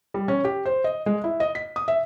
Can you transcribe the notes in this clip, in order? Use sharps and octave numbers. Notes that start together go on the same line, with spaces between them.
G3
C#4
G4
C5
D#5
G#3
E4
D#5
B6
D#6
E5